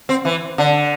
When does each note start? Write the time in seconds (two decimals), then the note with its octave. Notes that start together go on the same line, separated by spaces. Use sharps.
0.09 C4
0.25 E3
0.58 D3